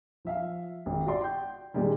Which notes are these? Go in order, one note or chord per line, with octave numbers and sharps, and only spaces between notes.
F3 E5 F5
G#1
F#4 D5 C6
G5 G6
A#2 D#3 G3 G#3